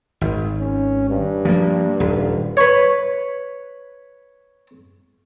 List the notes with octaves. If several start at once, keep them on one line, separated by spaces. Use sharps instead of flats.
G#1
C#4
G2
F3 A#3
D#1
B4 C#5